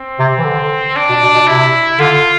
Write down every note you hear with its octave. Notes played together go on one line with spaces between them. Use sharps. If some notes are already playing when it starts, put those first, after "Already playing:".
Already playing: C4
C3
E3
D3
D4
B2
B2
B2
C3 E4
D3 F4